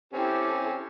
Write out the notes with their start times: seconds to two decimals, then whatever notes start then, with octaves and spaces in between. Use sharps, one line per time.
0.13 C4 C#4 E4 G4 A4